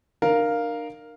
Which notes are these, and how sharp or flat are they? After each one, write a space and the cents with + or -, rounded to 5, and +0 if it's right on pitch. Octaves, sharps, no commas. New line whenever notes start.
D4 +45 A#4 +0 F5 +0